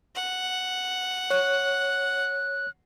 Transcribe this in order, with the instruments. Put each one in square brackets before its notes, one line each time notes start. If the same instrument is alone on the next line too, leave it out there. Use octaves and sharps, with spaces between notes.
[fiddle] F#5
[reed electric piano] C#5 [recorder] F#6